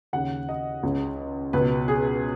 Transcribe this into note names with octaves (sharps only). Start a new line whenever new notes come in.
D#2 C#3 F#5
D#5
C#2 C#3
C#2 B2 B4
G#4